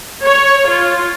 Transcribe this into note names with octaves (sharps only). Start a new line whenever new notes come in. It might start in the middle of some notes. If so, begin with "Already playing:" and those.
C#5
F4